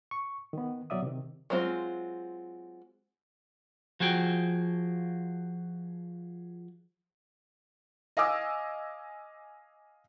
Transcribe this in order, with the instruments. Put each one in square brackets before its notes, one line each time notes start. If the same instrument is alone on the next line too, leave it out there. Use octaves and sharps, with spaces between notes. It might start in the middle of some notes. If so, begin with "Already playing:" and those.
[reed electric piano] C#6
D#3 B3
B2 F#3 D5 E5 D#6
C3 D#3
[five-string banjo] F#3 G#3 C4 F4
[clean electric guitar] F3 F#4 G#4 G5
[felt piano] D#5 F5 G#5 D6 E6